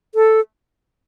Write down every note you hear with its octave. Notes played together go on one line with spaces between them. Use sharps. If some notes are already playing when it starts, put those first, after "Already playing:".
A4